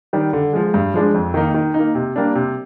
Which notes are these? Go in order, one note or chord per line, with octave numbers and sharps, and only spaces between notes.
D#3 G3
D3
F3 G#3
G2
F3 G#3 D4
F2
D#3 A#3 D#4
D#3
D#4
A#3
C3
G3 A#3 D4
C3